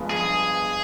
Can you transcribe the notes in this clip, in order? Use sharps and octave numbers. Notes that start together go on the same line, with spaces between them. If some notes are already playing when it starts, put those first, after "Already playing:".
Already playing: G2 F3 G#3 B3
G#4